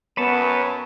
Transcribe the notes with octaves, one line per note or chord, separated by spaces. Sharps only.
F#2 B3 B4 C#5 A5